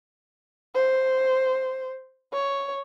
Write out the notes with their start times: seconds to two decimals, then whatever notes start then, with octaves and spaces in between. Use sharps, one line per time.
0.75 C5
2.33 C#5